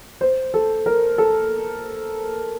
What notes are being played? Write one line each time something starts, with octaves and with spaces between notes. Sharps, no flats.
C5
A4
A#4
A4